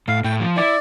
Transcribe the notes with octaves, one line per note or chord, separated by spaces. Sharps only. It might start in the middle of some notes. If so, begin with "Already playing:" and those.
A2 F5
A2 G5
F3
E4 D5